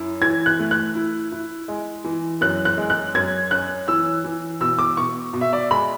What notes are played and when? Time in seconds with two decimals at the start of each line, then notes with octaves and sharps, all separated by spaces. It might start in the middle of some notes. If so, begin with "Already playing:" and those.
Already playing: F#2 E4
0.22 E3 G#6
0.46 F#6
0.59 A3
0.71 F#6
0.95 E4
1.32 E4
1.68 G#3
2.04 E3
2.41 F#2 F#6
2.65 F#6
2.78 G#3
2.90 F#6
3.14 F#2 G#6
3.51 C#4 F#6
3.88 E3 E6
4.24 E3
4.60 B2 E6
4.79 D6
4.97 B2 C#6
5.33 B2
5.41 E5
5.53 D5
5.71 G#3 B5